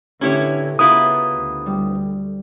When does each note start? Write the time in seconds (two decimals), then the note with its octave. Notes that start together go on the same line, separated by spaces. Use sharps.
0.21 A2 D3 C#4 E4 G4 B4 C#5
0.79 C#3 B3 E4 F4 A#4 B4 D#6
1.32 D2
1.66 G3